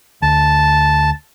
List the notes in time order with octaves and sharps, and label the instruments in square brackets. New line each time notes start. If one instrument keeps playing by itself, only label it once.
[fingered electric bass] D2 [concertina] A5